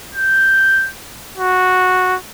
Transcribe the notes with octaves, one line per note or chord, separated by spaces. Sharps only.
G6
F#4